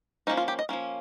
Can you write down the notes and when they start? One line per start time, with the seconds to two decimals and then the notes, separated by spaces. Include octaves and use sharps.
0.27 F3 A#3 C#4 D#4
0.37 F4
0.48 G4
0.59 D#5
0.69 F3 A#3 C#4